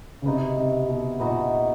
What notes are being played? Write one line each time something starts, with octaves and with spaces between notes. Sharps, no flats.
C#3
C3 B3 D#4 F#4
C3
B2
A#2 B3 D#4 F#4